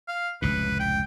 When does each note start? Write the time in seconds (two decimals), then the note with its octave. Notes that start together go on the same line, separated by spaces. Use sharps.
0.08 F5
0.42 F1 C#2 A2 B4
0.80 G5